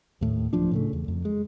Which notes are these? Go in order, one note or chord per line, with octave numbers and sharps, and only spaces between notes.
D#2 A2
D1 F3 D4
A2 C#3 A3
E2
F2
G#3